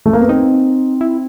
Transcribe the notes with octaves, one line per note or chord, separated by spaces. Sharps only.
A3
A#3
B3
C4 D#4
E4